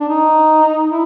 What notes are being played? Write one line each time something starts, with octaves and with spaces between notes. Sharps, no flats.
D4
D#4
E4